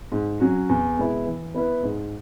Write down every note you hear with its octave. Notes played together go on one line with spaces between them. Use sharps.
G#2
F#3 C#4 F#4
E2
B2 G#3 B3 E4
E3
B3 E4 B4
G#2